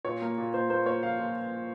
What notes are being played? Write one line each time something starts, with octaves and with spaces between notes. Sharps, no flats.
A#2 C#5
A#3
A#2
A#2 C5
A#3 C5
A#3 C#5
F3 F5
A#2